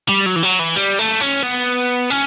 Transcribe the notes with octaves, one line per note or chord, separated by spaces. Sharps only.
G3
F#3
E3
F#3
E3
G3
A3
C#4
B3
C#4